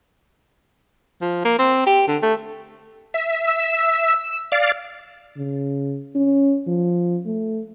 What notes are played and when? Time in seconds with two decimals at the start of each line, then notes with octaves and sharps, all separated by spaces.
1.21 F3
1.45 A#3
1.58 C4
1.86 G4
2.07 D3
2.22 A3
3.14 E5
3.47 E6
4.52 D5 F5
5.37 C#3
6.15 C#4
6.67 F3
7.26 A3